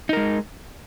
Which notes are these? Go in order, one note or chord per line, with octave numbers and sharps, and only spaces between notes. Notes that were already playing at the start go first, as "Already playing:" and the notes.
G#3 D#4 A#4